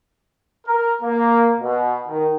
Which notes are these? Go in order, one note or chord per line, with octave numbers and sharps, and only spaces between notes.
A#4
A#3
B2
D#3